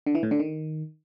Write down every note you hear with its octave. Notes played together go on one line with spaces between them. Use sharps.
D3
E3
A2
D3
D#3